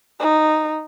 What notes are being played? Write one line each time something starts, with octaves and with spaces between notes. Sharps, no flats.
D#4